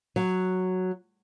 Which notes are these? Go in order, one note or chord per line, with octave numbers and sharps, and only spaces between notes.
F#3